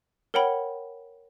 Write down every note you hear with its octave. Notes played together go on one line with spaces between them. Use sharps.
A#4 C#5 F#5 G5 B5